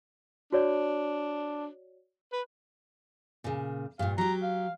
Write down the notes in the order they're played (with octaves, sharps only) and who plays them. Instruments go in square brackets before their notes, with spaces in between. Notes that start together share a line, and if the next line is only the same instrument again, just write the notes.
[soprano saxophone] D4 [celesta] F#4 C#5 D5
[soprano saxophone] B4
[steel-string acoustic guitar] A#2 C#3
[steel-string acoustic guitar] G2 A#2 [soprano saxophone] F5
[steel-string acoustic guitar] F#3 G4 [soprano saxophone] A#5
[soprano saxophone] F5